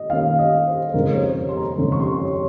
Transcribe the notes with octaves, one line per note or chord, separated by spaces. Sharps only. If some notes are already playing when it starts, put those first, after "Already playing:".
Already playing: D#5
D#3 A#3 C#4 F5
D#5
C5
C5
F2 C#3 G#3 D#4 A#4
C#5
C5
C5
C#5
C6
A#5
F2 C#3 G#3 D#4
C#6
C6
C#5
C#5